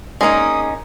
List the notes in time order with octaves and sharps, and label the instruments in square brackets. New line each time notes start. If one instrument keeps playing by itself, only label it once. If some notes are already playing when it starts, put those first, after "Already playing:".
[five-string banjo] G#3 A#3 [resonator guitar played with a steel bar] C#4 D#4 [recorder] D#6